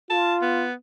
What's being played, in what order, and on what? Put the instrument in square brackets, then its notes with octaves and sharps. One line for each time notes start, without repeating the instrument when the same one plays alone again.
[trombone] F4 [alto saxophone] A5
[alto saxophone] B3